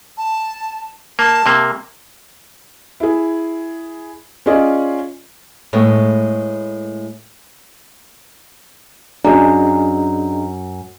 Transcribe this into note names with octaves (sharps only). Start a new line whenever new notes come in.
A5
A#3 A5
C3 A#3
E4 G#4
C#4 F4 G#4 D5 D#5
A2 G#3 A3 B3
F#2 D4 G#4 D#5 A#5